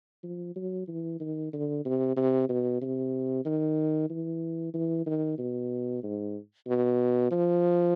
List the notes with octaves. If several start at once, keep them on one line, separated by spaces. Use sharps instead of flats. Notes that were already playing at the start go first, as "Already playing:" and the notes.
F3
F#3
E3
D#3
D3
C3
C3
B2
C3
D#3
E3
E3
D#3
B2
G#2
B2
F3